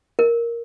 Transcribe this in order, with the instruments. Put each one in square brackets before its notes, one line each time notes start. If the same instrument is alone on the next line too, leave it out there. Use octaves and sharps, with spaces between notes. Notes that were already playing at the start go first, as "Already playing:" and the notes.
[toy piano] A#4